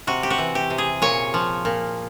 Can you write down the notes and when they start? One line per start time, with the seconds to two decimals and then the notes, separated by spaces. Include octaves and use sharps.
0.07 C3 F#4
0.23 G4
0.30 F#4
0.38 E3
0.55 G4
0.70 C3
0.78 G#4
1.02 A#2 C#5
1.34 F3
1.65 A#2